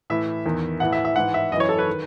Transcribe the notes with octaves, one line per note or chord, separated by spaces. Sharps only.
A2 E3 E5
E2 D#3
A2 E3 F#5
E5
E5
G#2 E3 F#5
E5
F#2 E3 C#5 D#5
A4
B4
D#3